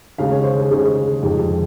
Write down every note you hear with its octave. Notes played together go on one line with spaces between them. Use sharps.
D#2 C#3 G#3 F5
C#5
C5
G#4
D#2 C#3 G#3 G#4
F2 C3 D#3 G#3